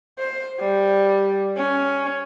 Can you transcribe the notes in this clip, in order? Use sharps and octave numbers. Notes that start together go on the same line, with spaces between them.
C5
G3
C#4